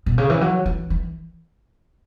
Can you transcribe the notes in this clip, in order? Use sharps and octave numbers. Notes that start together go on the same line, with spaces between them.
B2
C#3
E3
F#3
E3
E3